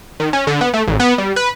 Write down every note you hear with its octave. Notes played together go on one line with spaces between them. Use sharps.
D#3
C#4
D3
B3
A3
A1
B3
G3
B4